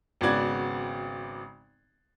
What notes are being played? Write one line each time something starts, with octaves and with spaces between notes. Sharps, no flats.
G#1 C#3 B3 F#4 D5 G#6